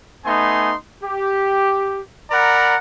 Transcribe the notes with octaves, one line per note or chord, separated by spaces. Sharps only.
A3 B3 D#4 G#5 C6
G4
A#4 D5 F#5 A#5 B5